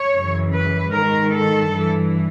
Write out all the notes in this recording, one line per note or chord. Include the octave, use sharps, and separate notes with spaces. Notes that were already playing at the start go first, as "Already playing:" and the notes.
Already playing: C#5
F#2 C#3 E3
B4
G#2 D#3 A#4
A4
G2
E3